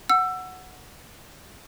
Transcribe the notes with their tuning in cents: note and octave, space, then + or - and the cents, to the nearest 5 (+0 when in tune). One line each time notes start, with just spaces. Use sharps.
F#5 -5 E6 +20